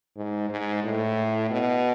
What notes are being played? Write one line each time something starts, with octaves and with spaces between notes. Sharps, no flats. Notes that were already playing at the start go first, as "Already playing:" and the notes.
G#2
G#2
A2
B2